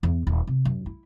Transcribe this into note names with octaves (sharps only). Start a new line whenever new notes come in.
E2
D#1
C3
F#2
E4